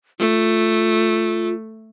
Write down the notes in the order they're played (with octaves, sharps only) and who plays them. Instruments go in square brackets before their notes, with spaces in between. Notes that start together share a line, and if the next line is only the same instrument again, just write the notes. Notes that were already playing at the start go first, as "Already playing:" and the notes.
[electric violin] A3 [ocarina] F4